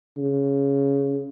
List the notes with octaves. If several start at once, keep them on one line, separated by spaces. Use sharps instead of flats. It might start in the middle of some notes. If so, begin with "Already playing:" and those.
C#3